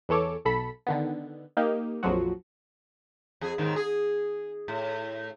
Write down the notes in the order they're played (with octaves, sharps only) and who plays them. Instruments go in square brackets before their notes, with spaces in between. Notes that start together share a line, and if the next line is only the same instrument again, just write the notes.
[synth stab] E2 E3 A4 C#5 D6
B1 A4 B5 B6
D3 D#3 B3
A#3 D#4 G4
A#1 F2 F3 F#3 F#4
[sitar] F2 G#4
D#2 G#2 D#3
G#4
A2